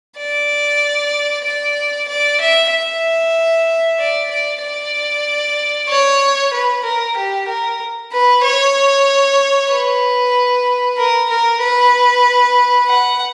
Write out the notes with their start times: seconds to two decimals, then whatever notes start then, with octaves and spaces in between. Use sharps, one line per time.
0.17 D5
1.45 D5
2.08 D5
2.40 E5
2.72 E5
3.99 D5
4.30 D5
4.62 D5
5.89 C#5
6.53 B4
6.84 A#4
7.16 G4
7.48 A#4
8.12 B4
8.44 C#5
9.71 B4
10.98 A#4
11.29 A#4
11.61 B4
12.88 F#5